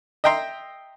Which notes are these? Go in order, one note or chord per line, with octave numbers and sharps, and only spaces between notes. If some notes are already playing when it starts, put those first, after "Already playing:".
D#5 E5 G5 A#5 C6